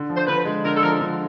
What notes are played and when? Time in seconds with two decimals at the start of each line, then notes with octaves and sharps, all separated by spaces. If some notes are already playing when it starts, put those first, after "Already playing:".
Already playing: D3
0.10 F3
0.16 C5
0.27 D3 B4
0.45 G#3
0.64 D3 A#4
0.76 A4
0.83 F3 A#4
1.01 D3